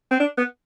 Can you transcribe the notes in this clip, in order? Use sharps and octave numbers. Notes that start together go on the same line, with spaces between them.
C4
D4
B3